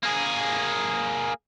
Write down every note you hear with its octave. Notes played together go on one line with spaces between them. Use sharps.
A#3 G#4